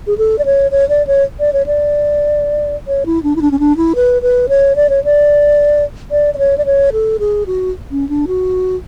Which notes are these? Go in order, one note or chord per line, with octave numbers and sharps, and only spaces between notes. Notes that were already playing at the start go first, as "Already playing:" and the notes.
G#4
A4
D5
C#5
C#5
D5
C#5
D5
C#5
D5
C#5
E4
D4
E4
D4
C#4
D4
E4
B4
B4
C#5
D5
C#5
D5
D5
D5
C#5
D5
C#5
A4
G#4
F#4
C#4
D4
F#4